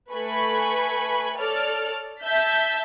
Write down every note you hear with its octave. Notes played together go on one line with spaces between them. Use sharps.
A3 B4 G#5 B5 C#6
A4 C#5 D5 F6
E5 A5 G6 B6